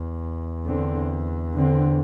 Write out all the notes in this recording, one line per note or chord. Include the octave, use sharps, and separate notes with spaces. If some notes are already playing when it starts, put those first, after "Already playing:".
Already playing: E2
D3 C4
D3 C4